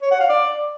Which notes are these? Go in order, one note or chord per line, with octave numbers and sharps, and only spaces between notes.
C#5
F#5
F5
D5